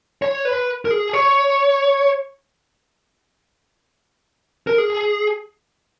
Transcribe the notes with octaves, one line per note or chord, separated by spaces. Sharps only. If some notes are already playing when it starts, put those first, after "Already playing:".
C#5
B4
A#4
G#4
C#5
A#4
G#4